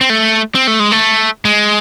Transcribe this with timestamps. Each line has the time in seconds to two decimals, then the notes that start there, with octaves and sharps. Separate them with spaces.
0.01 C4
0.10 A3
0.55 C4
0.67 A3
0.80 G#3
0.92 A3
1.45 G#3